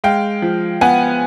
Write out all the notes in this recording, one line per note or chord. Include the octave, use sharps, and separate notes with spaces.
G#3 F5 G5
F3
B3 F#5 G#5